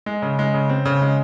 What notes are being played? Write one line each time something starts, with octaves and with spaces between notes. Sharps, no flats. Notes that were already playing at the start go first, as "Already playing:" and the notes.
G#3
C#3
G#3
C#3
C4
C#3
G#3